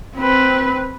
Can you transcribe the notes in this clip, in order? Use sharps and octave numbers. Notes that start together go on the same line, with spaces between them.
C4 B4